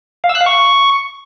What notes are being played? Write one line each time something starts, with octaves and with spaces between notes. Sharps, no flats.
F5
E6
F#6
F5
C#6